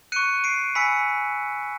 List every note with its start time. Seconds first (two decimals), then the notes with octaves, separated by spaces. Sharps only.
0.12 C#6 F#6 C#7 D#7
0.44 C7 D7
0.75 G#5 B5 E6 B6 C#7